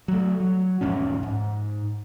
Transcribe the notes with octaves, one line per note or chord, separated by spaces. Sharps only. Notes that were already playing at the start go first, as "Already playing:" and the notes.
F#3 A3
F#3
E1 G#2 F3 C#4
G#2